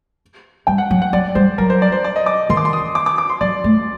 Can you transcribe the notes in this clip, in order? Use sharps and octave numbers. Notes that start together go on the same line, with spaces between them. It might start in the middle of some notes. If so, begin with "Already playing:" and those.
G3 G5
F#5
F#3
F#5
F#3 D5
G3 C5
F#3 A#4
C5
D5
C5
D5
D#5
D6
D#3 C6
D6
C6
D#6
D6
D6
D6
C6
F#3 D5
A3